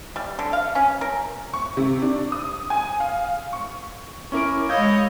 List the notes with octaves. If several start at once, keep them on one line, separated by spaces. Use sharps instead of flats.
G3
D3
F5
C#4
A#4
C#6
C3
D4
D#6
G#5
F5
C#6
C#4 E4 A#4 C#6 D6 D7
G#3 C#5 D#5 F5 B5 E6 G6 G#6